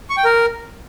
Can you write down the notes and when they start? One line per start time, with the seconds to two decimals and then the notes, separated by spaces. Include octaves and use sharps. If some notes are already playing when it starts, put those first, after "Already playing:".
0.10 C#6
0.17 G5
0.25 A#4